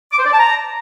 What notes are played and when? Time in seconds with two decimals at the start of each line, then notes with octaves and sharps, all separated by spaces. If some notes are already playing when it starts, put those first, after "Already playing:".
0.12 D6
0.19 C5
0.26 D5
0.33 A5
0.39 A#5